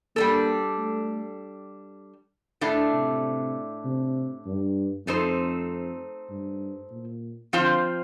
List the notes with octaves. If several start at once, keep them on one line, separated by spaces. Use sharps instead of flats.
G3 A#3 D4 A4
A3
A2 A3 D4
C3
C3
G2
F2 A3 C4 D#4 A4 C5
G2
A#2
D3 F3 C4 F4 C5